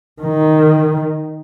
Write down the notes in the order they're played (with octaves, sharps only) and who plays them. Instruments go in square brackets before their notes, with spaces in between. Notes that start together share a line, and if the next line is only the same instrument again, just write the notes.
[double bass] D#3